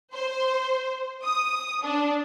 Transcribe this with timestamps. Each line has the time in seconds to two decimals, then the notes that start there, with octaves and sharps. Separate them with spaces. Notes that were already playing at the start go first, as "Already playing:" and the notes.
0.14 C5
1.24 D#6
1.83 D4